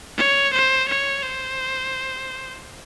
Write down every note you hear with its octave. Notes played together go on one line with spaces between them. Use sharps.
C#5
C5
C#5
C5